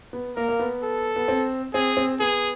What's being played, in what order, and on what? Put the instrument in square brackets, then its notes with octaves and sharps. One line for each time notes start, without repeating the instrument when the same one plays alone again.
[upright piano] B3
[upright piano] A#3 [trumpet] A#4
[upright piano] A#3
B3
[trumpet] A4
[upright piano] B3
C4
[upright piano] C4 [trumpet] G#4
[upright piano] C4
[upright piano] B3 [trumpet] G#4